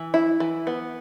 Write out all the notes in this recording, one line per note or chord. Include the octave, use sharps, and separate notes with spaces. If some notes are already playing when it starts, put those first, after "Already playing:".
Already playing: E3
E4
E3
B3